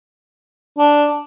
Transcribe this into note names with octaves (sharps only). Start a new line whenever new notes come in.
D4